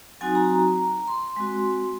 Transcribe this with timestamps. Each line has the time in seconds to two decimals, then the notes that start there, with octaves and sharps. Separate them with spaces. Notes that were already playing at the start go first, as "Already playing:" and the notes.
0.21 F#3 C4 D#4 F#4 G#5
0.35 A#5
0.50 A#5
1.08 C6
1.36 G#3 C4 F#4